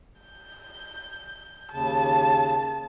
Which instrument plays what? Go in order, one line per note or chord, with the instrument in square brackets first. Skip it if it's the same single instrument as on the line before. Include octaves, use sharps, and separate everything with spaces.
[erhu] G6
[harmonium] D#2 C#3 [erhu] A5